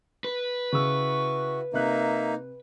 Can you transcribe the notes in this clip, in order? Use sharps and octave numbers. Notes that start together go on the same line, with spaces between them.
B4
C#3 E4 F#4 C#6 E6
C3 A#3 D#4 E5 F#6